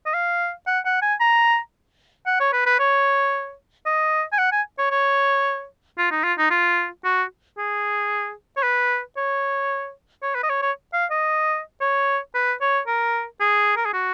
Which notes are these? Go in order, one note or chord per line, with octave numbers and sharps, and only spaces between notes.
D#5
F5
F#5
F#5
G#5
A#5
F#5
C#5
B4
B4
C#5
D#5
G#5
F#5
G#5
C#5
C#5
F4
D#4
F4
D#4
F4
F#4
G#4
C#5
B4
C#5
C#5
B4
D#5
C#5
C#5
F5
D#5
C#5
B4
C#5
A#4
G#4
A#4
G#4
F#4